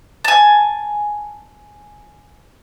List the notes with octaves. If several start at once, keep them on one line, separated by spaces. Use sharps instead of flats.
G#5 A5